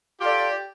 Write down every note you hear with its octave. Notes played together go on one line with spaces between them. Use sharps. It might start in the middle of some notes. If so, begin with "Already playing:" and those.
F4 G4 A4 D5